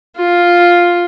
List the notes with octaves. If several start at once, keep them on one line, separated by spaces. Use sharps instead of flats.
F4